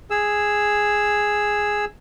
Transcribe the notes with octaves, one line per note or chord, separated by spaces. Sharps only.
G#4 E6